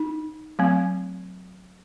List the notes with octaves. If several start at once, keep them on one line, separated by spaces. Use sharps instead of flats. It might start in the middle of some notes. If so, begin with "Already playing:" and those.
Already playing: D#4
F#3 A3 C4